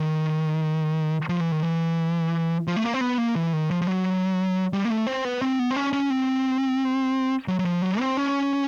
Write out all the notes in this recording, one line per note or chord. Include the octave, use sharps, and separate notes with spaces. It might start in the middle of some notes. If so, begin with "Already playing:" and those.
Already playing: D#3
F3
E3
D#3
E3
F3
A3
A#3
C4
B3
A#3
E3
D#3
F3
F3
F#3
G3
A#3
A3
C4
B3
C4
B3
C4
C#4
C#4
C4
F#3
F#3
F3
F#3
C4
C#4